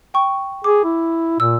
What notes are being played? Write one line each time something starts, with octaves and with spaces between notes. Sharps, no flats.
G5 C#6
G#4 D6
E4
A#2 E6